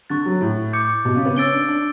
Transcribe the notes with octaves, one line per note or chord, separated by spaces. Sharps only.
D3 C#6 F#6 A6
F#3
A2
D6 G6 C#7
B2
C#3
B3
C#4 E6 A6 D7 G7
D4
D4